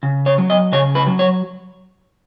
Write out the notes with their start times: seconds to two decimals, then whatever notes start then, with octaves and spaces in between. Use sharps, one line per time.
0.03 C#3
0.26 C#5
0.38 F#3
0.50 D#5
0.72 C#3 C#5
0.95 B4
1.07 F#3
1.19 C#5